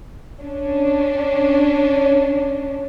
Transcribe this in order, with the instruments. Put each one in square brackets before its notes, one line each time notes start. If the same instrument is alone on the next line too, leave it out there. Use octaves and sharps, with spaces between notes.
[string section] C#4 D4